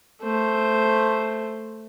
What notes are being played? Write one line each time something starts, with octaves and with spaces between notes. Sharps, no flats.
A3 C5